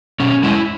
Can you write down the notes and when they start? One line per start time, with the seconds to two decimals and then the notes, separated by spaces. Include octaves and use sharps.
0.20 B2 C#4
0.43 G#3 E4